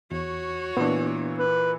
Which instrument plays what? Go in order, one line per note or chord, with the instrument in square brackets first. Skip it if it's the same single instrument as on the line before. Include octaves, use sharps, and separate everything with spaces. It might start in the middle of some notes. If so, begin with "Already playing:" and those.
[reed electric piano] E2 [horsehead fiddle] F#4 C#5
[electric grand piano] A#2 E3 [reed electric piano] B3 D4
[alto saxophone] B4